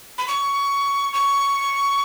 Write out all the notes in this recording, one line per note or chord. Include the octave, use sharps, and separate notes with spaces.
B5
C#6
C#6